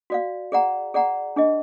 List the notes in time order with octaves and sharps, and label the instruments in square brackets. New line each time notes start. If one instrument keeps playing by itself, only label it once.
[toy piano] F#4 D5 F5
G#4 D5 F#5 A#5
G#4 D5 F#5 A#5
D4 G#4 D#5